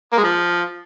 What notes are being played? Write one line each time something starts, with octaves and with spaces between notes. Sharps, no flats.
A#3
G#3
F3